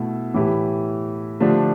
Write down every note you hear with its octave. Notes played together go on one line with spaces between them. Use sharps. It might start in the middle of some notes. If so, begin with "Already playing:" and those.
Already playing: B2 A3 E4
A2 E3 A3 E4 G4
D3 F3 A3 D4 G4